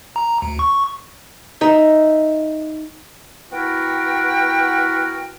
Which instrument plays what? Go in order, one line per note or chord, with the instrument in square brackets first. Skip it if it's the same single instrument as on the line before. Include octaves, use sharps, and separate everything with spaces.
[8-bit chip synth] A#5
D2
C#6
[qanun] D#4 E5
[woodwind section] B3 E4 F#4 A#4 G5